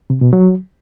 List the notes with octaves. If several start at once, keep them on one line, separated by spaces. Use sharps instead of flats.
C3
B2
F#3